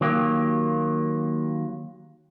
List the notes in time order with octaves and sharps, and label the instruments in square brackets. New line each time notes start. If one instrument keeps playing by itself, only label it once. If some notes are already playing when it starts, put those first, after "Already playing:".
[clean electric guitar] D#3 F#3 A#3 F4 G4